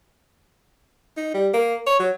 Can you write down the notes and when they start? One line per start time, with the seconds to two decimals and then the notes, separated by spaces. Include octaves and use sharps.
1.17 D#4
1.34 G3
1.54 A#3
1.87 C#5
1.99 F#3